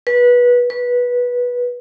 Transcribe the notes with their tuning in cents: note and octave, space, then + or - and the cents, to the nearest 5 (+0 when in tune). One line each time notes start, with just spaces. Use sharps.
B4 -20
B4 -15